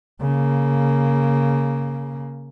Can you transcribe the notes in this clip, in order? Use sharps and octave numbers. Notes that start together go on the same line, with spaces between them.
C#3 A#3